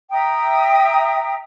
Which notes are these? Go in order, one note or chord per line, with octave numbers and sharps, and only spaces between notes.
E5 G5 A#5 D#6